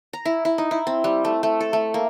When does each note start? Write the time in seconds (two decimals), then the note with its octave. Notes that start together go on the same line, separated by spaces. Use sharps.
0.13 A#5
0.25 E4
0.45 E4
0.58 D#4
0.71 E4
0.87 C4
1.04 G3
1.25 A3
1.43 A3
1.60 A4
1.73 A3
1.94 A#3